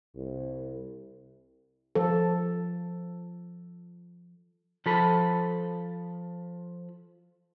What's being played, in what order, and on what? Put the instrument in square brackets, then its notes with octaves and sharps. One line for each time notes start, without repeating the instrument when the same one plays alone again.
[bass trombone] C2
[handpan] F3 A4
[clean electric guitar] F3 A4 B5